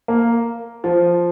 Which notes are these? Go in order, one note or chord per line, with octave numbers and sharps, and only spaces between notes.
A#3
F3